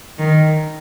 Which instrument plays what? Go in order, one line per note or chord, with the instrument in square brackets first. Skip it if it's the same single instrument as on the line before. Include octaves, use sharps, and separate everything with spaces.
[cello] D#3